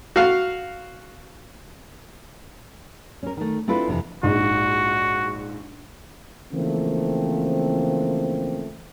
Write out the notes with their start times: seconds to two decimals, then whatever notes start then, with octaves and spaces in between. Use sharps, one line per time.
0.16 F#4 F5
3.23 C#4 A#4
3.37 D#3 A3
3.68 C4 D4 E4 F4 A4 B4
3.88 F2 C3 E3
4.23 A#1 G#2 F#4
6.52 C#3 E3 F3 A3 A#3 C4